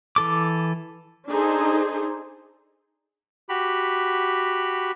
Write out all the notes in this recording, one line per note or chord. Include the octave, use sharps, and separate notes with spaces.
E3 A4 D6
D4 D#4 G#4 A4 C5
F#4 G4 B5